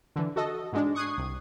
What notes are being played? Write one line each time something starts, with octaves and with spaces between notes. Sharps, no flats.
D3 E3
F#4 A4 D#5
G#2 G#3 D4
C#6 D#6 F#6 G#6 C7
C2